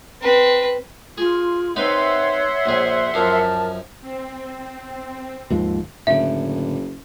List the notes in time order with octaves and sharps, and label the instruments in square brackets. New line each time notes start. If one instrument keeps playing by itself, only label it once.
[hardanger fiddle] C4 B4
[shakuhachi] F4 [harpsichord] G#4
[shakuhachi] C4 [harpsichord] D#4 B4 [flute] C#5 [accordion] E5 F#5 C6
[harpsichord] A#1 G#4 [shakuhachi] C5
[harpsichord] F#2 F3 [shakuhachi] A#4 [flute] A5
[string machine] C4
[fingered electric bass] D#2 G#2 F3
[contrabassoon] F#1 [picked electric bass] A2 D3 [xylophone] E5